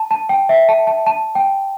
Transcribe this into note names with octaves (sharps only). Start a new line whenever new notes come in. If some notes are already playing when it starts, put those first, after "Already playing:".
Already playing: A5
A5
G5
E5
A5
A5
A5
G5